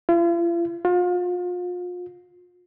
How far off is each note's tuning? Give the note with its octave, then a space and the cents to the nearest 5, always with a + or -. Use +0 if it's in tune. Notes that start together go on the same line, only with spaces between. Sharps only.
F4 -45
F4 +35